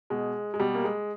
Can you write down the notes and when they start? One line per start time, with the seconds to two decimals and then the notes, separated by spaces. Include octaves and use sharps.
0.10 B2 G#3
0.54 G#3
0.60 B2 G3
0.75 A#3
0.84 G#3